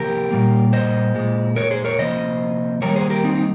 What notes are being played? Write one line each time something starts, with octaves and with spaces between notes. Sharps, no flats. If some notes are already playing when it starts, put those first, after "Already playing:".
Already playing: C3 F3 A#3 G4 A#4
A#2 G3 A#3
C5 D#5
A#2 G#3
A#4 C#5
G#4 C5
A#4 C#5
C3 F3 A#3 C5 D#5
D#3 G3 A#3 A#4 C#5
G#4 C5
G4 A#4
C4 D#4
D#4